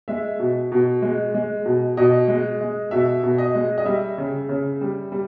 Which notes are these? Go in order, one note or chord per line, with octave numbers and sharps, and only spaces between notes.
G#3 E5
B2
B2
G#3
G#3
B2
B2 D#5
G#3
G#3
B2 E5
B2
D#5
G#3
D#5
G3 E5
C#3
C#3
G3
G3